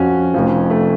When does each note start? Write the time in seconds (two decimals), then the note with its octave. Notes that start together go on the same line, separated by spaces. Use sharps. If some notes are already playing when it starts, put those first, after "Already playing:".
Already playing: F2 F3 C#4 F#4
0.34 F1 F2 F3
0.70 A3